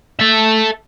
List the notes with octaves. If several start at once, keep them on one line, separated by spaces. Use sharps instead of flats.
A4 E5